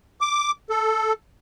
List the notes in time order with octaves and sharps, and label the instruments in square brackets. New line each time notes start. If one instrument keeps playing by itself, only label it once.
[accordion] D6
A4